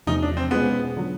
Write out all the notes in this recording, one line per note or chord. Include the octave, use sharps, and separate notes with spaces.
E2 C3 F3 A3 C#4 D#4
D4
C4
B2 G#3 B3 C#4 F4 G#4
D3 F#3